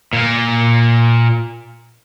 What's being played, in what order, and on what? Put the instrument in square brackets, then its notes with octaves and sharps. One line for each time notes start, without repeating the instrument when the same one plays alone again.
[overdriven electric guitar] A#2 A#3